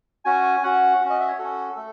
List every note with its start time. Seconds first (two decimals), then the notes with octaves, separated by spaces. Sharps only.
0.25 C#4 F#4 G#5
0.63 C#4 F#4 F#5
1.01 C#4 F#4
1.10 D#5
1.20 E5
1.28 C#5
1.39 C#4 F#4 A4
1.76 A3 A4